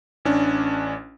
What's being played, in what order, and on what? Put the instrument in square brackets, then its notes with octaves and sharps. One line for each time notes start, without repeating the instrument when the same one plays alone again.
[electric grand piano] A1 C#4 D4